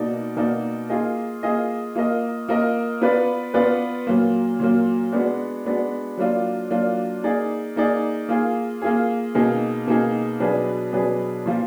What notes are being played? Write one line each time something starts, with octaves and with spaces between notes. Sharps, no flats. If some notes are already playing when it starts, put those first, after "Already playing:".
Already playing: B2 A#3 D#4 F#4 D5
B2 A#3 D#4 F#4 D5
A#3 F4 G#4 D#5
A#3 F4 G#4 D#5
A#3 F4 A#4 D#5
A#3 F4 A#4 D#5
B3 F4 B4 D5
B3 F4 B4 D5
A#2 F#3 A#3
A#2 F#3 A#3
G#3 B3 D4 F#4
G#3 B3 D4 F#4
F#3 A#3 D4 F4
F#3 A#3 D4 F4
A#3 D#4 G#4 D5
A#3 D#4 G#4 D5
A#3 F4 G#4
A#3 F4 G#4
B2 A#3 D#4 G#4
B2 A#3 D#4 G#4
B2 F#3 D4 G#4 B4
B2 F#3 D4 G#4 B4
A#2 F3 A#3 F4